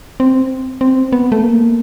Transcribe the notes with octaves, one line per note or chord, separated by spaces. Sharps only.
C4
C4
B3
A3
A#3